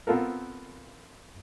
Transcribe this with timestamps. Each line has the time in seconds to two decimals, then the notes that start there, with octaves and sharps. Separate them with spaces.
0.07 B3 C4 F4 A4 A#4